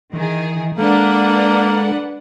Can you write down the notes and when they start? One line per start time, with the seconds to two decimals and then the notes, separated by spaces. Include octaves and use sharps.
0.13 D#3 E3 G#4
0.78 G#3 A#3 D4 A4 B4 F#5